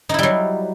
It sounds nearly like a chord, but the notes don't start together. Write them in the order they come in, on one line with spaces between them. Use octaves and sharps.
D#4 E4 G3 F#3